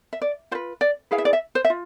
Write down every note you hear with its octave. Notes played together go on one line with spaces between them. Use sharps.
E5
D5
F4 B4 C5
D5
E4 G#4 B4 F5
E5
D5
E5
C5
E5
F4